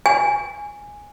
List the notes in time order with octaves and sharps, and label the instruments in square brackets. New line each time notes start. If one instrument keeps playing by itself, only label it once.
[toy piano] G#5